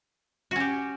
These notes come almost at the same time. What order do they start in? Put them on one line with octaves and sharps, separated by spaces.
F#4 C#4 G4